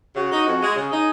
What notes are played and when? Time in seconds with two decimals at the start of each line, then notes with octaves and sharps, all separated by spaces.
0.16 C#3 F#4
0.32 D#4
0.47 F2
0.61 G#3
0.76 C#3 G#4
0.91 D#4